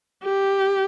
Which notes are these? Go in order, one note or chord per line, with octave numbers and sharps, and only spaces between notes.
G4